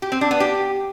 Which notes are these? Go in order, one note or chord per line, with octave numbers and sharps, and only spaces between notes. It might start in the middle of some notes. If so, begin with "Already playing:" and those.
G4
C4
D4
B3
G4